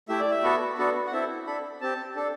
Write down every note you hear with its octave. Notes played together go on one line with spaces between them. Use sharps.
A3 E4 G4 E5
D5
E5
B3 F#4 A4
B3 D4 F#4 A4
F#5
C4 E4 A4 E5
D4 A4 B5
C4 G4 A5
D4 A4